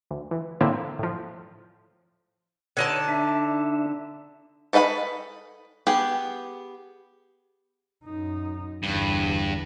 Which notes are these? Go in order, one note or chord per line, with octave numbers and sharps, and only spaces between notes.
D2
E3
A2 D3 A#3 C4 E4
A2 F3
D3 D#4 C#5 A5
D4 E5
A4 B4 D#5 F5 B5
B3 G4 G#4
F#2 D#4
G1 E2 G2